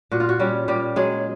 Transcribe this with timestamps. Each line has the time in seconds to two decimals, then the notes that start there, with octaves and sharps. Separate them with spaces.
0.11 A#2 F#4
0.20 F4
0.29 F#4
0.40 G3 C#4 G4
0.68 A#2 G3 G4
0.96 F#3 G#3 G#4